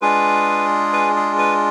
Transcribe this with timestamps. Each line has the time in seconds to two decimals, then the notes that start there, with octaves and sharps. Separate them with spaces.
0.01 G#3 D4 F4 G#4 B4
0.93 B4
1.16 G#4
1.38 B4